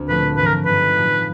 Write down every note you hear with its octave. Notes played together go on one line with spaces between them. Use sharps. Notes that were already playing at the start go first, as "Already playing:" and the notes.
Already playing: D2 C4
A#2 F3 A3 B4
G#2 E3 A3 B4
A#4
G2 D#3 F#3 B4
A2 F3 G#3